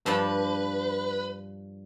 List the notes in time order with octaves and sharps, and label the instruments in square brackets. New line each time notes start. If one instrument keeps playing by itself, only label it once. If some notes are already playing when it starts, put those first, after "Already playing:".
[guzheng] G2 F3 D4 [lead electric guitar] B4